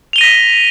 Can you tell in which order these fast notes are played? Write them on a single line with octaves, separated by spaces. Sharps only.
F7 G7 D#7 A#6 B6